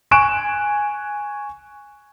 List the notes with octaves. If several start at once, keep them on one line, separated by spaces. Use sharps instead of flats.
G#5 C#6 F#6 D7 E7